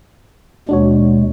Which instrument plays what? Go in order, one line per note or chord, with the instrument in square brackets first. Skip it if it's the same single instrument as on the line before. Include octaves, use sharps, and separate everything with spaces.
[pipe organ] D#2 B2 G#3 [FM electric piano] D4 F#4 C#5